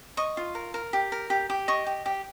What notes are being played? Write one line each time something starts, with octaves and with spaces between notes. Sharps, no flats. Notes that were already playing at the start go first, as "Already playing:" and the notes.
D#5 C#6
F4
A#4
A#4
G4
A#4
G4
G4
D#5 C#6
G4
G4